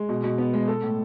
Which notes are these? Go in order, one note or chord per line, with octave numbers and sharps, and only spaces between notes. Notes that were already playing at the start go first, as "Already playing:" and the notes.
Already playing: G#3
B2
B2
B3
G#3
A4
A2